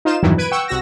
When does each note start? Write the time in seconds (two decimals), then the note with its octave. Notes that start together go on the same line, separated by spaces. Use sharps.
0.05 D#4 F4 C5 E7
0.23 E2 G2 B2 D#3 E3 F#3
0.38 B4 G#6 D7 D#7
0.52 F#5 G5 C#6 E6
0.68 C2 F#4 E6 A#6